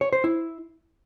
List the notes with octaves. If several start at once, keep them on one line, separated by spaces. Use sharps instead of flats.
C#5
C5
E4